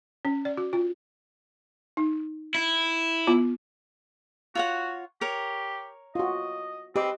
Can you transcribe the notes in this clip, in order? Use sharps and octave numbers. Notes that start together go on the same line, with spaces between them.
C#4
D5
F#4
F4
D#4
E4
B3 F4
F4 F#4 C#5 F#5
G4 A#4 C#5
F4 F#4 D#5
C4 G4 B4 D#5 D6